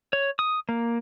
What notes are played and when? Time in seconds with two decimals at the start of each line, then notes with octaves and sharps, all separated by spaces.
0.13 C#5
0.39 D#6
0.69 A#3